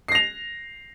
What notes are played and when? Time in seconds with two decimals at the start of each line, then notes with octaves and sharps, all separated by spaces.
0.08 C7
0.12 A#6
0.15 F7